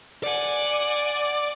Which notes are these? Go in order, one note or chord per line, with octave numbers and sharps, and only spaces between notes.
D5 F#5 G#5